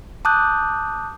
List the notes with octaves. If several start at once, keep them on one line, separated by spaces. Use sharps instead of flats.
A5 D6 D#6 F#6 G6